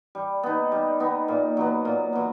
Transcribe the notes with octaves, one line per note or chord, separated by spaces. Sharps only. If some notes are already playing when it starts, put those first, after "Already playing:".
G3
B3 D#4
G3
B3 D#4
A#2
F#3 B3
A#2
F#3 B3